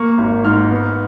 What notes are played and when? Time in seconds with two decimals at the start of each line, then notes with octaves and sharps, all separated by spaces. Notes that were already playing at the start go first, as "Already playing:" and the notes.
Already playing: A#3 C#6
0.18 G#1
0.45 G#2 F6
0.71 B3